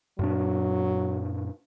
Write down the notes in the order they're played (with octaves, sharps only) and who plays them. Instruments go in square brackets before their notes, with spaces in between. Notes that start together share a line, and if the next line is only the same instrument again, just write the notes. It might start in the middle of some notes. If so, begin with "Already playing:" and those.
[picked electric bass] F#2 A#2 D4 [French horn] F#3